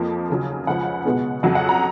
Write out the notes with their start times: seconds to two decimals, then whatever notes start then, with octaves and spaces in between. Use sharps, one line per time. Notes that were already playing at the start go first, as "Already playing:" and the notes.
Already playing: F2 F3 A#3
0.30 D#2 C#3 F#3
0.67 C#2 C#3 F3 F#5
1.05 B2 G#3 B3
1.43 F2 C#3 F#3 F#5
1.55 F#5
1.69 A#5